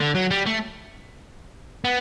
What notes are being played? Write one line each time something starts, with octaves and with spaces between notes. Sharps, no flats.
D3
F#3
G3
A3
B3